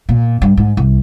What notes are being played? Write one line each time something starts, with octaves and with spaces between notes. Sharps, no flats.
A#2
G2
G#2
C2